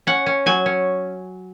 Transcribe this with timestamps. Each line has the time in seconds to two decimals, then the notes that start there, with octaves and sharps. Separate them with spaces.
0.07 C#4 F#5
0.26 C#4
0.46 F#3 G#5
0.66 C#4